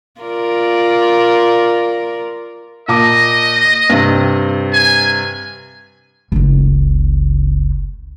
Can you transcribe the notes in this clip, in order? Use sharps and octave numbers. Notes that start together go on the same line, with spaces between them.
F4 A#4 D5
A#2 D#5 A5 D6
G2 C3
G#5
F#1 C#2